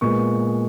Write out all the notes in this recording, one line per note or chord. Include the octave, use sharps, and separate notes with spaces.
A#2 G#3 B3 C#6